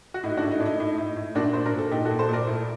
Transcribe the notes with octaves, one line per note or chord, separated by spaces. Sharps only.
F#4
A2 D#4
D4 F#4
A2
D#4
A2 D4
D#4
A2 D#4
A2
A2
A#2 D4 F#4
A#2 C5
A#4
A#2
A4
A#2 D#4 G4
F#4 A4
A#2
A4 C5
A#2 A#4 D5
A2